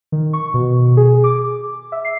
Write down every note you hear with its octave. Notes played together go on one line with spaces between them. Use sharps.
D#3
C#6
B2
G#4
D6
E5
C7